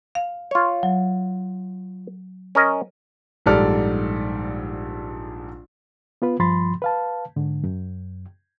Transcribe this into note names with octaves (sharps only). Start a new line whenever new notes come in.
F5
F4 C#5
F#3
C#4 A#4 D#5
A#1 G#2 G3 A4 D5 F6
B3 F4 B4
G2 F3 B5 C6 A6
B4 F5 A5
G#2 D3
F#2